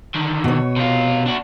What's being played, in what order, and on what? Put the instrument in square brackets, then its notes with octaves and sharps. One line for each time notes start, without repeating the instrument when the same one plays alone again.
[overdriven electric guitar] D3 D#3
[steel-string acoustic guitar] B2 C#5
[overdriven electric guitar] C3 F4
D4 F#4